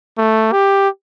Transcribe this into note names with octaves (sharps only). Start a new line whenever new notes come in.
A3
G4